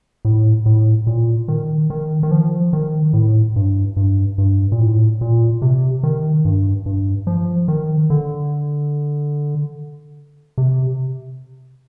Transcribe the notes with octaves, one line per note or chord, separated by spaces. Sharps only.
A2
A2
A#2
D#3
D#3
D#3
F3
D#3
A2
G2
G2
G2
A#2
A2
A#2
C3
D#3
G2
G2
F3
D#3
D3
C3